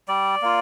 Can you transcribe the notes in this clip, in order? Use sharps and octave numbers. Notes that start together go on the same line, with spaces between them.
G3 D5
A#3 F4